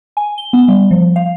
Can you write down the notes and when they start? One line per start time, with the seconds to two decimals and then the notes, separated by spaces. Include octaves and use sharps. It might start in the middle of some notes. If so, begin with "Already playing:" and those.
0.17 G#5
0.38 G7
0.53 B3
0.68 G3
0.91 F3
1.16 F5